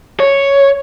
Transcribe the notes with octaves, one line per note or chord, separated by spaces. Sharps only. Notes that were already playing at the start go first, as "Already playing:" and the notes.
C#5